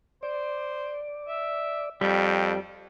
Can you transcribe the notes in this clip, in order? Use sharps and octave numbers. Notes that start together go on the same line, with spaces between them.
C5 D5
E5
F2 G3 G5